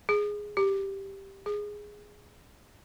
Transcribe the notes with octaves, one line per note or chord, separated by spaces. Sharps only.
G#4
G4
G#4